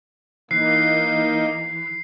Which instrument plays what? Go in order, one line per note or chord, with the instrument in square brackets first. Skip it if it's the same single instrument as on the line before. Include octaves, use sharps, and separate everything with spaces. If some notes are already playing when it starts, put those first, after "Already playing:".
[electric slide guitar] E3 [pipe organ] A#3 D#4 [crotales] C7